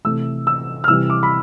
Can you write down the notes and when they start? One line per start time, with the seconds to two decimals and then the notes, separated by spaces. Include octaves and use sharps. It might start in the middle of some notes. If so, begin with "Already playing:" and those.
0.05 C3 E3 A3 E6
0.47 E6
0.84 F6
0.88 C3 E3 G3 E6
1.10 D6
1.23 B5